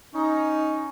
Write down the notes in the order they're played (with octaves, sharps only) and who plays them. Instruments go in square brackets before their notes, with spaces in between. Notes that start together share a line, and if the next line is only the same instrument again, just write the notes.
[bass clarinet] C#4 [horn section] D#4